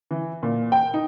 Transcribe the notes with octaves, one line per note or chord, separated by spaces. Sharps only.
E3
A#2
G5
D#4